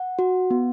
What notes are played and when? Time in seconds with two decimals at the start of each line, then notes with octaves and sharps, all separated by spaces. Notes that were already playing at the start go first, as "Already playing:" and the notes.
Already playing: F#5
0.19 F#4
0.50 B3